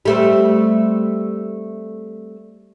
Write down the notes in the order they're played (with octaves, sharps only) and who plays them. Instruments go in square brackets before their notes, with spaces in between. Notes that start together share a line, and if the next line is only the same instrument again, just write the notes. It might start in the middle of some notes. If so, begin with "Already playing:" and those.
[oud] G3 A3 C4